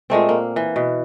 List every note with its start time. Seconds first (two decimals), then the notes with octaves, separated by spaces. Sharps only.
0.10 A#2 G#3 A3 C4
0.29 A#3
0.56 E3
0.76 B2